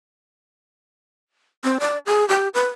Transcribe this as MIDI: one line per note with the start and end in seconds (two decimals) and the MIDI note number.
1.64 1.78 60
1.80 1.98 74
2.06 2.28 68
2.29 2.48 67
2.54 2.67 71